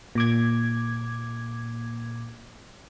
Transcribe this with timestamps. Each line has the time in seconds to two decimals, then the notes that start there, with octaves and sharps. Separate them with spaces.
0.15 A#2 D6 G#6